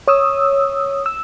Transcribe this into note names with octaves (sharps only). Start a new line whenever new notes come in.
C#5 D#6 E6
E6